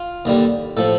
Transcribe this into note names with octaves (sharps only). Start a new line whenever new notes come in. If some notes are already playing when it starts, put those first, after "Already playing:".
Already playing: F4
D#2 D3 G3
A2 F3 A4